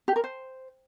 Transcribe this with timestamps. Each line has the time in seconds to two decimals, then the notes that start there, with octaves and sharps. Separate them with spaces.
0.08 G4
0.16 A#4
0.24 C5